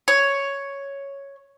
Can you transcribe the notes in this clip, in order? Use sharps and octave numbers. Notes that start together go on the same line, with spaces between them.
C#5